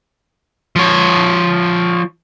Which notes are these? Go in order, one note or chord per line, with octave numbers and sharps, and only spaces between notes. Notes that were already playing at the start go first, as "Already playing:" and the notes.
F3 C#5